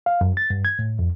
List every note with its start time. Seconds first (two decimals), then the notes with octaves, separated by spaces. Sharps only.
0.06 F5
0.21 F#2
0.37 A6
0.50 G2
0.65 G#6
0.79 A2
0.99 F2